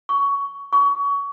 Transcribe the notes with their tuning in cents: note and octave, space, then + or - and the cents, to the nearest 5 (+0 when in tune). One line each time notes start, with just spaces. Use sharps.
C#6 +15
C#6 +25